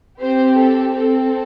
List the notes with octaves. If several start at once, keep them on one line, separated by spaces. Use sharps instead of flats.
C4 G4 C5
A4
C4 A4